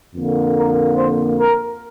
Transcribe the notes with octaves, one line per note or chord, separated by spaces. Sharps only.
F2 D3 A#3
A#4
C5
A#4